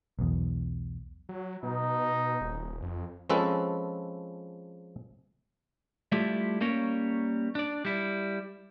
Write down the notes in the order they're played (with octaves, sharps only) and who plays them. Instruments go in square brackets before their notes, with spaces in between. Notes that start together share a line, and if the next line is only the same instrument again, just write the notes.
[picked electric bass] B1 E2
[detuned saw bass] F#3
[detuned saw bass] B2 [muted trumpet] D#4
[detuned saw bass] D#1
F2
[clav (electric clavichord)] F3 G#3 C4 C#4 A4 B4
[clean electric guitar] G3 A3 E4 F4 G4 A4
G3 A#3 C#4 A#4 C#5
D4 D5
G3 E4